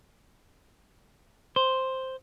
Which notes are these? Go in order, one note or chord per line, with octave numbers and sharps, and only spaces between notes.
C5